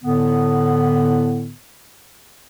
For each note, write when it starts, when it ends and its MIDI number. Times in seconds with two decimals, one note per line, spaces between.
0.03 1.52 45
0.03 1.52 50
0.03 1.52 59